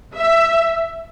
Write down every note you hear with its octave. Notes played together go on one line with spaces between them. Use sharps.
E5